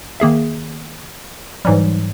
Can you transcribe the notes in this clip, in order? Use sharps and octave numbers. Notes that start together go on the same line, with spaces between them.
D#3 A#3 G#4 E5
G#2 E3 F#3 G3